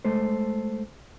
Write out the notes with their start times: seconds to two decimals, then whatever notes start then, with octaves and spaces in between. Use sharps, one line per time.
0.05 G#3 A3 A4 C5